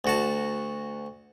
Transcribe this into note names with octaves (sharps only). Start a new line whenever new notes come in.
D2 F#4 A5